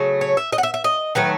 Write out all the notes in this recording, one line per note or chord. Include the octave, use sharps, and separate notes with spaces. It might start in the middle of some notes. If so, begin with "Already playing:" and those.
Already playing: C#3 F#3 A3
C#5
E5
D#5
F#5
E5
E5
D#5
D#3 F#3 A3 B4